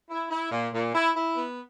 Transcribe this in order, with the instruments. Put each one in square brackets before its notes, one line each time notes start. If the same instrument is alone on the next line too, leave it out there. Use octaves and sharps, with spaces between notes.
[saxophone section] E4
E4
A#2
A#2
E4
E4
B3